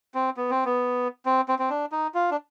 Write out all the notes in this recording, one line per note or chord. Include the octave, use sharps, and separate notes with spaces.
C4
B3
C4
B3
C4
C4
C4
D4
D#4
F4
D4